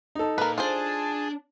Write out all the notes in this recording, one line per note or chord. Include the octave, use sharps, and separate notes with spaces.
D#4 A4
A#2 A#4 B4
D4 F4 G#4 C5 G#5 A5